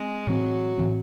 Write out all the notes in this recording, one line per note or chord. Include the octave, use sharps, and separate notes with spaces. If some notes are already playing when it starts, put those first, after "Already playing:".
Already playing: G#3 C4
A2 E3 F#3 C4
A2 E3 C4